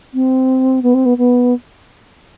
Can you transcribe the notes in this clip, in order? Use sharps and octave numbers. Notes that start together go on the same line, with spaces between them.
C4
B3
C4
B3
B3